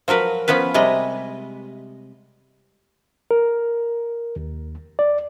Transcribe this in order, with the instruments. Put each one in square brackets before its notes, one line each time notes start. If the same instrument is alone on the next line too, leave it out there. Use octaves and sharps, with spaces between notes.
[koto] F3 F#3 A#4 B4
F3 B3 C#4 B4
C3 G3 G#3 D#5
[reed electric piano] A#4
D#2
D5